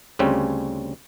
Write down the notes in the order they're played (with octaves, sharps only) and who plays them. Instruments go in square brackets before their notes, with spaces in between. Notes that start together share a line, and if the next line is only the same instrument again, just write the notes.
[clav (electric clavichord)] D2 C#3 G3 C4 C#4